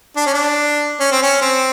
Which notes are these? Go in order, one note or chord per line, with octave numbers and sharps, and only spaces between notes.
D4
C#4
D4
C#4
C4
C#4
C4